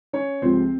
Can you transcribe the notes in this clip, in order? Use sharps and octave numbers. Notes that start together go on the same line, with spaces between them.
C#4 C#5
C#2 C3 F3 C4 C5